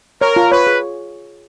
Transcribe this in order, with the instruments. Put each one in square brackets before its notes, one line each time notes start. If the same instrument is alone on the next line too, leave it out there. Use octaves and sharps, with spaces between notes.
[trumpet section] A#4 [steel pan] C#5
[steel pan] F4
[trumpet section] B4 [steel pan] C#5
[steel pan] G#4